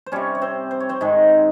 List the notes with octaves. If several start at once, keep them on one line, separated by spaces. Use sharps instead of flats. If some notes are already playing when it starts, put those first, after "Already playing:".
C5
C3 G3 C#4 C#5
C#5
C4 C5
C5
C#5
C4 C5
G#2 D#3 G#3